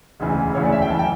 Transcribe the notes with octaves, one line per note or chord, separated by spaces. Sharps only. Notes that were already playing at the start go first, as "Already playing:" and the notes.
E1 D2 C#3 E3
E1 D2 C#3 E3 C#5
D5
E5
G5
F#1 E3 A5
G5